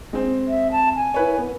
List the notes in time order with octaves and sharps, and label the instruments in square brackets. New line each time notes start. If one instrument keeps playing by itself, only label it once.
[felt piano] G#3 C4
[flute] E5
A5
G#5
[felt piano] E4 B4 C#5
B3